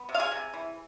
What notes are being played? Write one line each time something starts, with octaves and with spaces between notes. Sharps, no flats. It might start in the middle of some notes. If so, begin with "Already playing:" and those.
Already playing: B3
C3
F5
G#4 G#5
C3
E3